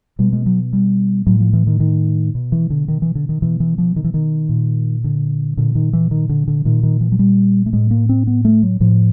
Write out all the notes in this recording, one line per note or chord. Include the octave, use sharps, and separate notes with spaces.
B2 G3
G#3
F#3
G3
A2 F#3
F3
E3
D#3
D#3
B2
E3
D3
D#3
E3
D3
D#3
B2 E3
E3
F3
D#3
E3
D#3
A#2
D3
A#2 D3
D#3
E3
D#3
D3
D3
A#2 D#3
D#3
E3
F#3
G3
A3
A2 G#3
A#3
C4
B3
A3
F#3
A2 F3